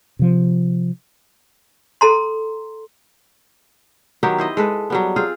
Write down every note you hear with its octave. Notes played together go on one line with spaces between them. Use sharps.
C3 F3
A4 A#5 C6
D#3 F#3 B3 G4
E4 C5 D#5
G#3 A4 B4
F#3 G3 B3
C4 F4 G#4